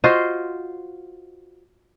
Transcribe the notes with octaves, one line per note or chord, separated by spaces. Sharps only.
F4 F#4 C5 D#5